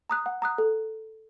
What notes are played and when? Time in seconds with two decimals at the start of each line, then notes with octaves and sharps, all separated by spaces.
0.10 A#5 D#6 F#6
0.26 F#5
0.42 A#5 D#6 F#6
0.58 A4